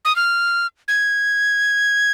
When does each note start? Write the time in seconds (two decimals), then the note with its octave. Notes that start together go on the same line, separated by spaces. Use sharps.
0.05 D#6
0.16 F6
0.88 G#6